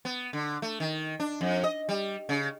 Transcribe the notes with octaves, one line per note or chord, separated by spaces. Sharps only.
B3
D3
A3
D#3
D4
F2
D#5
G3
C#3